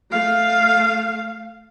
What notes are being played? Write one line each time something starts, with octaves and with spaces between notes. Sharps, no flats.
A3 F5